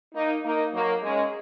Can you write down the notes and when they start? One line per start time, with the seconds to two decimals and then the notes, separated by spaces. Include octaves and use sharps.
0.15 A#3 D#4
0.44 A#3 D#4
0.74 F#3 A#3
1.02 G#3 C#4